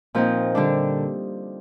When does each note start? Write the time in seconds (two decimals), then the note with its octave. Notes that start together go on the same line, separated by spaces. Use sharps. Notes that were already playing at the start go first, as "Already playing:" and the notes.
0.15 A#2 F3 C4 D#4
0.55 D3 G3 D4